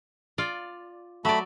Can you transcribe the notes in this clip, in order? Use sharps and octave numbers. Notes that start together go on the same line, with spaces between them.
F4 D5
F#3 A3 D5 B5